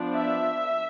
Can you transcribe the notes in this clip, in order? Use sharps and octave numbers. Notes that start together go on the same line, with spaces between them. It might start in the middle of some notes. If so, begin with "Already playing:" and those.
Already playing: F3 B3 D4
E5